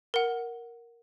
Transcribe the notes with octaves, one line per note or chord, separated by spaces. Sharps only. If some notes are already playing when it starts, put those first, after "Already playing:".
A#4 F#5